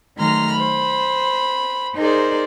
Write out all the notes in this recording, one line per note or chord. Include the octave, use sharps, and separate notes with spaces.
D#3 F#3 A3 A#5 C6 F6
C5 B5
D#4 G#4 A#4 C5 D5